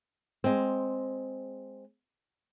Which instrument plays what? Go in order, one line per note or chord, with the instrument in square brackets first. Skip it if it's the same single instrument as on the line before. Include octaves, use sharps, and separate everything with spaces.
[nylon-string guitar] G#3 C4